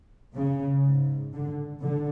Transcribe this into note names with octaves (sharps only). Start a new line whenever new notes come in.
C#3
G#2
D3
D3